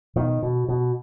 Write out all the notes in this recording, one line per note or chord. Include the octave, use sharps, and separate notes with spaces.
B2 D#3
B2
B2